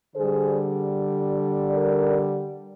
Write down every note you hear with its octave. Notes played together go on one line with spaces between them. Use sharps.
D3 G3 G#4 C5
A#4 D5